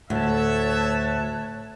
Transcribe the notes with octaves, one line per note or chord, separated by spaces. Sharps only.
D2 A2 C#5 E5 A5 F#6